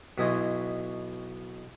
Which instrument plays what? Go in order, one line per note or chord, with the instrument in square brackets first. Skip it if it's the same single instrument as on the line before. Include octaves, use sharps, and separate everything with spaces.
[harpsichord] B1 B2 E4 D#5 G#5 C6